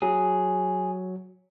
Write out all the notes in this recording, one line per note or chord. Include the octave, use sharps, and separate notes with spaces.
F#3 G#4